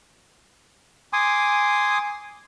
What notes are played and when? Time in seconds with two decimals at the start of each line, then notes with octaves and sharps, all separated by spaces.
1.13 G#5 C6 D6 D#6